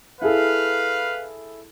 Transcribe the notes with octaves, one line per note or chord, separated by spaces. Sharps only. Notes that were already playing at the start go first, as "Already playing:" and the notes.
E4 G#4 A4 B4 F5